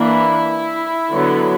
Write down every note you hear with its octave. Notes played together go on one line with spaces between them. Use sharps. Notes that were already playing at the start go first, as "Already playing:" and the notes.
Already playing: E3 A#3 D4 E4
D3 F#3 B3